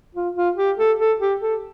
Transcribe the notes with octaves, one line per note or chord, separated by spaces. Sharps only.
F4
F4
G4
A4
A4
G4
A4